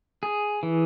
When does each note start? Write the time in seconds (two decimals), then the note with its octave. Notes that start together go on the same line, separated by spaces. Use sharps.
0.23 G#4
0.63 E3